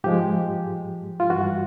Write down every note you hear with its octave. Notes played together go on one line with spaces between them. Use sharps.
G#2 F3 G#3 G4
F4
G2 E3 G3 F#4